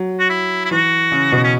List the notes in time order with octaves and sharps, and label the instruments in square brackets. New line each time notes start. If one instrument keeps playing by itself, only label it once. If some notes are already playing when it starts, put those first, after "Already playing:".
Already playing: [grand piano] F#3
[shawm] F#4
E4
E4
[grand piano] E3 [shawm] F#4
[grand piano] C#3
B2
[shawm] C#4